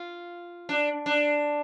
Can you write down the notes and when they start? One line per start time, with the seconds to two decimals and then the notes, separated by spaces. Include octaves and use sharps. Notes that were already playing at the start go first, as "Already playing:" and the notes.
Already playing: F4
0.69 D4
1.06 D4